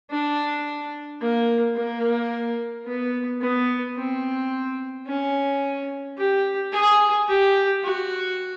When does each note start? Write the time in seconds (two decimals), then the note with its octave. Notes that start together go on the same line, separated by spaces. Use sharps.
0.10 D4
1.21 A#3
1.75 A#3
2.86 B3
3.41 B3
3.96 C4
5.07 C#4
6.17 G4
6.73 G#4
7.28 G4
7.83 F#4